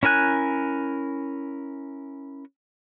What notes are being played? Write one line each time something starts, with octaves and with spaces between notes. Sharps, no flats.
C#4 E4 A#4 G#5 F#6